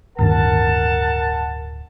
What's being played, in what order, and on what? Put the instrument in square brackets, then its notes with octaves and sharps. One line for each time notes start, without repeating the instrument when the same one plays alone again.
[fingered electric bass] D1 G2 D#3 [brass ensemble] A#4 F#5 A5